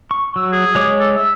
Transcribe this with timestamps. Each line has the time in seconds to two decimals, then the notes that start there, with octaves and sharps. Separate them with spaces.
0.11 C#6
0.36 F#3 E6
0.52 G#4
0.75 G#3 C#5 D6
1.00 A4
1.16 E5